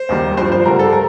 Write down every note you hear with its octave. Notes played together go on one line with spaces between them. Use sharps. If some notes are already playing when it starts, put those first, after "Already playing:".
Already playing: C5
D#2 D#3 G3
G2 F3 C5
C5
G2 D3 G3 A#4
A4
A#4